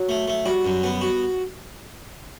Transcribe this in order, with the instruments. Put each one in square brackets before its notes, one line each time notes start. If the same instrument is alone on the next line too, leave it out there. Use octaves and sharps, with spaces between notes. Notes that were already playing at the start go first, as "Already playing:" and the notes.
Already playing: [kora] F#3
[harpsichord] A3
A3
[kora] G3 [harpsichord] F#4
[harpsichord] F#2
B3
F#4